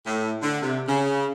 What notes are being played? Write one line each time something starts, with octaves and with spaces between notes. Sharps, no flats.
A2
D3
C3
C#3